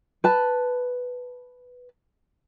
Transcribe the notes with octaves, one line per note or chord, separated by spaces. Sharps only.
B4 A5